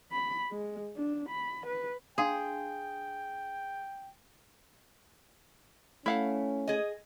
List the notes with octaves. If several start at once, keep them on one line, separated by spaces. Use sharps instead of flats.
B5
G#3
D4
B5
B4
D4 G#4 F5 G5 C6
A3 C#4 E4 F5 F#5
G#4 D#5